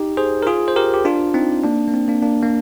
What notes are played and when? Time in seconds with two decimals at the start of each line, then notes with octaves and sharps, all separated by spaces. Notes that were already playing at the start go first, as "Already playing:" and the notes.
Already playing: D#4 G4
0.17 G#4 C5
0.43 A#4
0.47 F4 G#4
0.68 C5
0.76 G4 A#4
0.94 G4
1.05 D4 F4
1.34 C4 D#4
1.64 A#3 D4
1.88 A#3
1.94 C4
2.08 A#3 D4
2.22 A#3 D4
2.43 A#3